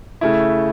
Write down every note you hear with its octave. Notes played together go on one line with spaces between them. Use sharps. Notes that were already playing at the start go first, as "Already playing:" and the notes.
C#3 A3 E4